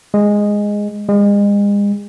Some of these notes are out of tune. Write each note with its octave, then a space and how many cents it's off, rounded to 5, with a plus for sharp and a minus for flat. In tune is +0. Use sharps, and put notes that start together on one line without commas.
G#3 -5
G#3 -35